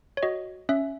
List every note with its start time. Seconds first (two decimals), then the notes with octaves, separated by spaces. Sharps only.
0.17 C#5
0.23 F#4 D#5
0.69 C#4 E5